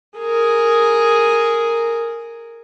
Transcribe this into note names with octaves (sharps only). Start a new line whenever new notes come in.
G#4 A#4